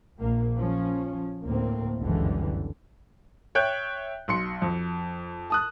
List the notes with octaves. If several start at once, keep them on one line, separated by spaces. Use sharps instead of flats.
A#1 A#3
F3 C#4
D2 A2 A#3 C4
G1 C#2 F#2 D3 E3 G3
C#5 E5 G5 F#6 G6
B1 C6 C#7
F2
A5 D#6 F#6